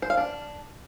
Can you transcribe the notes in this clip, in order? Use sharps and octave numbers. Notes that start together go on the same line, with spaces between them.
C5
F5
D4